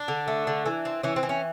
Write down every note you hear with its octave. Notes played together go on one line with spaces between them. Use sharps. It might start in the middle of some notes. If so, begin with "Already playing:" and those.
Already playing: D4
D3
A3
D3
E3
C4
E3 C#4
C4
E3
C#4